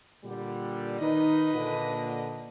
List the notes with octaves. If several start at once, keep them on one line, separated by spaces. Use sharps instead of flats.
A#2 D3 G3
D#3 D#4 B4 D#5
A#2 D3